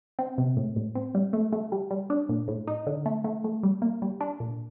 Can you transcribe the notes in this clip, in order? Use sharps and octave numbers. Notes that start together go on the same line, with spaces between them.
C4
C3
A2
A2
C4
G3
A3
A3
G3
G3
D4
A#2
A2
D#4
D3
A3
A3
A3
G3
A#3
G3
D4
A#2